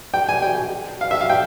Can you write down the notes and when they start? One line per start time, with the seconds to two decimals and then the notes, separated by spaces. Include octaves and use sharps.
0.14 G5
0.29 G#5
0.42 G5
1.01 F5
1.11 E5
1.21 F5
1.30 G5